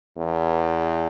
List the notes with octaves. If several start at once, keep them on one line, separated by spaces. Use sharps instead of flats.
E2